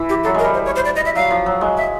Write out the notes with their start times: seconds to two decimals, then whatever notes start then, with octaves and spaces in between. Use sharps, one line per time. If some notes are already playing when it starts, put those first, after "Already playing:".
Already playing: E3
0.09 G4
0.24 F#3 A4
0.34 G#3 A#4
0.45 G3
0.54 C5
0.65 C#5
0.76 C5
0.85 D5
0.96 D#5
1.05 E5
1.15 F#3 F5
1.31 F3
1.46 F#3
1.61 G#3
1.77 E5